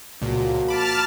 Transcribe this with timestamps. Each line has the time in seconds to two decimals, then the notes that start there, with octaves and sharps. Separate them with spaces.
0.22 C#2 A#2 F3 A#3 F#4
0.68 A5 B5 D6 F6